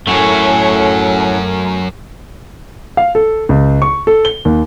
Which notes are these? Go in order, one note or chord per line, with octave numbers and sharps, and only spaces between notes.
F#2 A2 A3 C#4 F#4 C#5 F#5 G#5
F5
A4
C#2
C#6
A4
G7
D#2